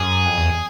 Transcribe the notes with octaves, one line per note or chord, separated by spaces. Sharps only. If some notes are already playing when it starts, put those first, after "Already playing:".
Already playing: F#2 G#4
F2
E2